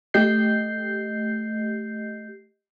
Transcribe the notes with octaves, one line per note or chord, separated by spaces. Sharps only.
A3 G4 D#5 G6 C7